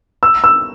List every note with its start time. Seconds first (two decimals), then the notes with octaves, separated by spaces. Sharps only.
0.23 E6
0.44 E6